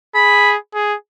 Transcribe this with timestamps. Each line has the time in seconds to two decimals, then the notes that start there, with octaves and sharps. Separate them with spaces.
0.15 G#4 B5
0.75 G#4